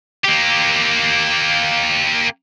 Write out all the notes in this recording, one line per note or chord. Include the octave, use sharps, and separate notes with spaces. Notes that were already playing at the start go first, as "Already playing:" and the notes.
A#3 G4